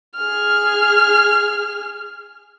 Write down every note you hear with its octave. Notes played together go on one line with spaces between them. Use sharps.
G#4 F6